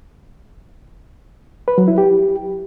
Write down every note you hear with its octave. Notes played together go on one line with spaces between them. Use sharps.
B4
F#3
E4
G4